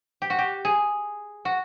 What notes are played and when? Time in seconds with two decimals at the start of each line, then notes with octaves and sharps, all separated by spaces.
0.22 G4
0.30 F#4
0.39 G4
0.65 G#4
1.45 F#4